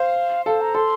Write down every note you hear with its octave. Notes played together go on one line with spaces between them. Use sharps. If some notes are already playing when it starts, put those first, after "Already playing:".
Already playing: C5 F5
A4 F5
A#5
A4 C6